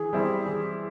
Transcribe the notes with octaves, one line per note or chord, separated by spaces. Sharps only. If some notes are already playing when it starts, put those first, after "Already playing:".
Already playing: E3 G#4
G3 C4 E4
E3